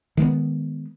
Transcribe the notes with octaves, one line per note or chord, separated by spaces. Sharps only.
D#3 G#3 A3 B3